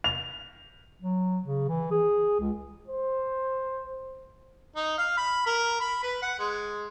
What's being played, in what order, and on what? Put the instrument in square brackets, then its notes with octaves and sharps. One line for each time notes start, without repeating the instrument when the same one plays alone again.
[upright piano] F7
[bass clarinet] F#3
C#3
E3
G#4
C#2
[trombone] C5
[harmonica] D#4
F5
B5
A#4
B5
B4
F#5
G#3